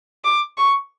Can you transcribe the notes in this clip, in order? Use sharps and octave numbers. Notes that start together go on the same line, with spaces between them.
D6
C#6